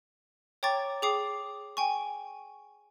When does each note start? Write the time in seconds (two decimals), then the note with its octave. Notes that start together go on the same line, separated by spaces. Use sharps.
0.63 C#5 G5 A#5 C#6 D6 A6
1.02 G#4 G5 D6 D#6 C7
1.77 G5 G#5 C#6